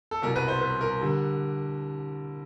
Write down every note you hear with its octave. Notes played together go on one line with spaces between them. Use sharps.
A4
C2 B2 F#3 A#4
B4
C5
B4
A#4
D3 G3